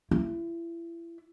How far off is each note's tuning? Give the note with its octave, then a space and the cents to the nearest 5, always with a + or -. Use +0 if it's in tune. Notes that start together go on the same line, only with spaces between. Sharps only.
E4 +30